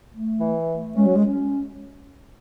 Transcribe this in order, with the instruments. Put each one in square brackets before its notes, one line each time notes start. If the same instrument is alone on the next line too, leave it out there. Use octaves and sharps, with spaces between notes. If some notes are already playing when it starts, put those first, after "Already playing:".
[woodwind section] A3
E3
A3
[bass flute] G#3 [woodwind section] C#4
[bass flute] F#3
G#3
[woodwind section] C#4